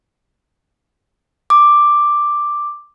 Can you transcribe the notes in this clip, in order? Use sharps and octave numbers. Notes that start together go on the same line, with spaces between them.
D6